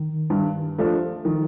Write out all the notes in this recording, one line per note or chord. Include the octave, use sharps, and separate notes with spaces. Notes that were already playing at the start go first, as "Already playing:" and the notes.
Already playing: D#3
G2
F3 A3 D4
D#3 F3